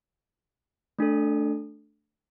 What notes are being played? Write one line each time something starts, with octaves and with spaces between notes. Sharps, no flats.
A3 D4 A4